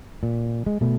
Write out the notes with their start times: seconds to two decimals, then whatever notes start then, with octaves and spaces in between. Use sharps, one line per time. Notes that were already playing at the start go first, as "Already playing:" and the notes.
0.23 A#2
0.66 G#3
0.81 B2 A3